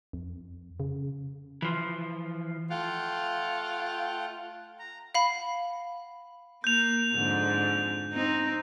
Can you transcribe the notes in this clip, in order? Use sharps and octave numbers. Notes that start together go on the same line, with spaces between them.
F2
C#3
E3 F3
A3 F4 F#5 G5
A#5
F5 F#5 B5
A#3 G6 F7
F2 G#2 D3
C4 D#4